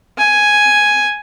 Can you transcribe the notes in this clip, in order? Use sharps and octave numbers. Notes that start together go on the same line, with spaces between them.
G#5